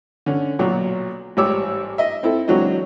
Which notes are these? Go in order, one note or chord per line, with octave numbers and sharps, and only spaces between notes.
D3 C#4
B1 A#2 F#3
A1 G#2 G3 C#5 D6 E6
D#5 E5
C4 E4 A4
C#2 E3 F#3 C4 D4 D#5